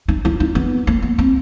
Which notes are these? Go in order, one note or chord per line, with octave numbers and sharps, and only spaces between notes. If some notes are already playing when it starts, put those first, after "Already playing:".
D#4
E4
D#4
B3
A#3
B3
C4